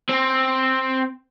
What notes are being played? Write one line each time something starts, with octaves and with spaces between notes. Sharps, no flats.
C4